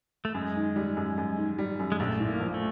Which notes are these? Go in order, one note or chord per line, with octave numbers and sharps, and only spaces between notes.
A3
F#2 G#3
D#3
G3
F#2
F#2
D#3
G3
F#2
G#3
A#1 A3
A2
A#3
F3
A3